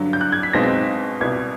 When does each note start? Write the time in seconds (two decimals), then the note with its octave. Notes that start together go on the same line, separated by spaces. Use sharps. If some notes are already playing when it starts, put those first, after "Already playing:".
Already playing: G2 D3 F#3
0.13 G6
0.21 F#6
0.32 G#6
0.43 B6
0.53 B1 B2 G#3 C4 D#4 A#6
0.64 B6
1.21 C2 B2 G3 G#6